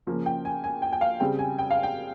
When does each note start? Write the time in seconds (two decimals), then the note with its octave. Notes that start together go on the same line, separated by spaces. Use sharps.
0.07 C#3 F3 A#3 C#4
0.26 G5
0.45 G#5
0.64 G#5
0.82 G5
0.93 G5
1.01 F5
1.20 C#3 G3 C4 G5
1.39 G#5
1.59 G5
1.71 F5
1.83 G5